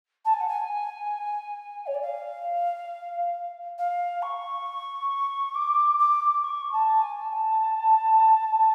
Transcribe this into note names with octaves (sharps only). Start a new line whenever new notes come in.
A5
G#5
F#5
G#5
C#5
D5
F5
F5
C#6
D6
D6
C#6
A5
G#5
A5